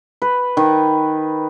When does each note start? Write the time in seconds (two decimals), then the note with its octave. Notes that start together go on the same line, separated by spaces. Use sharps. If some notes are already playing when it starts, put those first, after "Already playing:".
0.22 B4
0.57 D#3